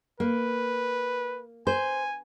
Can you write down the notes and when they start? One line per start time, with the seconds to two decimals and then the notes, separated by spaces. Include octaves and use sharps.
0.20 A#3 B4
1.67 C5 G#5